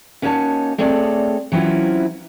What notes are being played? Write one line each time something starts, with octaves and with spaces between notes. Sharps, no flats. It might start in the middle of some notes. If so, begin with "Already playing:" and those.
A#3 C#4 D#4 F#4 C#5 A5
A3 C4 G#4 A4 C#5 D5
E3 F#3 C4 C#4 E4 F4